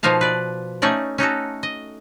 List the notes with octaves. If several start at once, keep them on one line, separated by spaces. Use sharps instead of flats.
B2 F3 A#3 D#4 F5 A5
B4 D5
A3 C#4 D#4 D5
C#4 D#4 F#4 A4
D#5